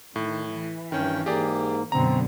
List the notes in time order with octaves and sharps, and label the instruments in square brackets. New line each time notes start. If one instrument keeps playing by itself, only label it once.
[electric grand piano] A2 [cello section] D#3
[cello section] E3
[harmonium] G2 G5 [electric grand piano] D#3 C#4
[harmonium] G#2 A#3 [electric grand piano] G4 G#4 D5
[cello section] F#2 B2 D3 [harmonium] C4 [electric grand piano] A#5